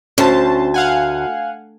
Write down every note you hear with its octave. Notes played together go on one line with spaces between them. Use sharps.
D2 C#4 C5 A5
F5 F#5 G#5